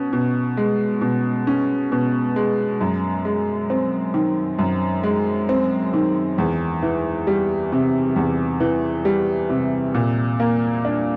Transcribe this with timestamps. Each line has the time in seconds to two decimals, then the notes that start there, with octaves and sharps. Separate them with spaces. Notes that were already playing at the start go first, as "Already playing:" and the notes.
Already playing: B2 C#4
0.13 B2
0.57 G#3
1.01 B2
1.47 C#4
1.92 B2
2.36 G#3
2.81 F#2
3.25 G#3
3.70 C4
4.14 D#3
4.59 F#2
5.03 G#3
5.49 C4
5.94 D#3
6.38 E2
6.83 E3
7.27 G3
7.72 C3
8.16 E2
8.60 E3
9.05 G3
9.50 C3
9.94 A#2
10.40 A#3
10.85 D4